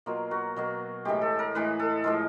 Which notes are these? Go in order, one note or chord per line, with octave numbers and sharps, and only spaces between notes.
B2 F#3 A#3 F4
F#4
B2 F#3 A#3
A2 E3 G#3 G4
A4
A#4
A2 E3 G#3 B4
A4
A2 F3 G#3 A#4